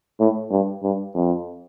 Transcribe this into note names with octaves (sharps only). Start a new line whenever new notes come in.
A2
G2
G2
F2